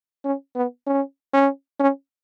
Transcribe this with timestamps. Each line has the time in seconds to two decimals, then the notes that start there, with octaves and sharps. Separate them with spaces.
0.25 C#4
0.55 B3
0.87 C#4
1.33 C#4
1.80 C#4